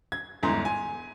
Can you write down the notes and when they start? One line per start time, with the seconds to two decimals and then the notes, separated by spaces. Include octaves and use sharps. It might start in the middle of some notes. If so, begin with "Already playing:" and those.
0.12 G#6
0.43 G1 E2 G#2 A#5 C6
0.65 G#5